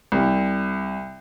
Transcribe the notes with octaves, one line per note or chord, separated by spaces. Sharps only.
C2